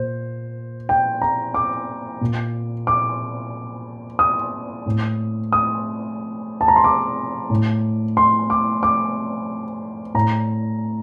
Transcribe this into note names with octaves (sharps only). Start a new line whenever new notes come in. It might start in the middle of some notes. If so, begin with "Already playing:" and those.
Already playing: A#2 C5
G5
A#5
D6
A#2
D6
D#6
A2
D#6
A5
A#5
C6
D6
A2
C6
D6
D6
A2 A#5